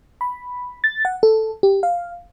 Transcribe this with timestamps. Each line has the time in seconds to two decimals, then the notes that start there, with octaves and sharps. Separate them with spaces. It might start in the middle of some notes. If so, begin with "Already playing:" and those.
0.21 B5
0.84 A6
1.05 F#5
1.23 A4
1.63 G4
1.83 F5